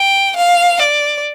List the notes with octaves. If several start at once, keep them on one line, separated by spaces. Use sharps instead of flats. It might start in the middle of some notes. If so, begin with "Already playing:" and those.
Already playing: G5
F5
D5